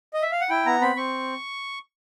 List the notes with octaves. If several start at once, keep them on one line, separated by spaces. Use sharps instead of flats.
D#5
E5
F5
F#5
E4 G5
B3 A#5
C4 B5
C4 C#6